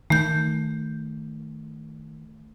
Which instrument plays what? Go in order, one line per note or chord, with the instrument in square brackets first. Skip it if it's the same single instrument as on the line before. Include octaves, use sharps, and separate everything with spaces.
[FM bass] D#3 [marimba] A3 G6